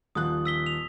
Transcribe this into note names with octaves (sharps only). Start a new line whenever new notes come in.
D#1 F3 D#6 F#6
E6 B6 G7
F7